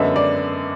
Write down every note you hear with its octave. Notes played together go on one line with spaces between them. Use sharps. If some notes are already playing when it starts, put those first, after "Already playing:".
Already playing: F#2 D3 G#3 B3 E5
D5